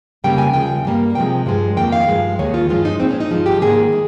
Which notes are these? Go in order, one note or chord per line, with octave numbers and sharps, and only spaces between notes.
F2 C#3 G3 A#3 G5
G#5
D#2 C#3 F3 G#3 G5
G2 G3 A#3
C3 F3 G#3 G5
G2 F3 G#3
F2 D#3 A#3 G5
F5
G2 F3 G#3
D#2 D#3 G#3 C#5
F4
G2 F3 G#3 F4
D#4
A#2 G#3 C4
C#4
D#4
G2 F3 G#3
G4
G#2 D#3 A#3 G#4
G#3